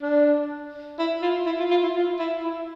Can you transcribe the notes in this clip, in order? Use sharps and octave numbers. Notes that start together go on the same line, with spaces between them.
D4
E4
F4
E4
F4
F4
E4
F4
E4
E4